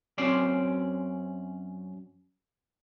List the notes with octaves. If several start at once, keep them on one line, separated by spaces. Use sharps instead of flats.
F#2 C4 C#4 C5 D5